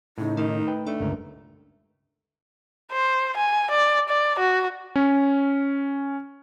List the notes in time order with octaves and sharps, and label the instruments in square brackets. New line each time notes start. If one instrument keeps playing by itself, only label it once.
[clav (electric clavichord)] A2 C#3 [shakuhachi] D#4
[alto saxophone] D#3 [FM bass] A3
[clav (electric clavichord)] B4 G5
[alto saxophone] A3 [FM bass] D4
[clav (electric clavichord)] G1 C#2 A#4
[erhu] C5
G#5
D5
D5
F#4
[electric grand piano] C#4